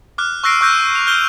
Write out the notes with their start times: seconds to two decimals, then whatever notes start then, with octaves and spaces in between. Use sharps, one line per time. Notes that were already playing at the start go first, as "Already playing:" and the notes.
0.18 D6 F6 F#6
0.44 C#6 E6 F#6 A#6 C7 D7
0.61 C#6 E6 F#6 G6 A#6 D#7
0.95 F7
1.07 F6 G6 G7